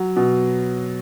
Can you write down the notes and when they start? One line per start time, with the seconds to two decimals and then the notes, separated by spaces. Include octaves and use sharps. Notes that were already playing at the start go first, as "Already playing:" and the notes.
Already playing: F#3
0.16 B2